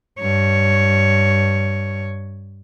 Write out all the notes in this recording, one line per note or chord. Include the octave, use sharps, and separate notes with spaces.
G2 C#5